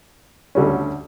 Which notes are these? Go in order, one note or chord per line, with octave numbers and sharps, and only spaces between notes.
D2 D3 G3 C#4